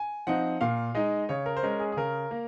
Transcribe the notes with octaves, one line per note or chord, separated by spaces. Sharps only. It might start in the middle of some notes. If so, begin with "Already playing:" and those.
Already playing: G#5
F3 C4 D#4 F#5
A#2 F5
G#3 D#4 D#5
C#3 C#5
A#4
C5
G#3 C#4 A#4
G#4
G#4
C#3 A#4
A#3